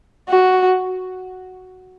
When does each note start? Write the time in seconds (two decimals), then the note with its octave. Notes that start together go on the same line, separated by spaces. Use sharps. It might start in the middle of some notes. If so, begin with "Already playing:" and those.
0.29 F#4